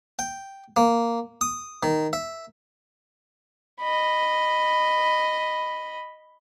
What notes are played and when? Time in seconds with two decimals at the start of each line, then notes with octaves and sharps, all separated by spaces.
0.19 G5
0.77 A#3
1.41 D#6
1.83 D#3
2.13 E5
3.80 D#5 B5